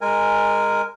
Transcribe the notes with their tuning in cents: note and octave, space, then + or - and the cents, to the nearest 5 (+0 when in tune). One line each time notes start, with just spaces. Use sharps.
G#3 -10 A#4 +0 G#5 -15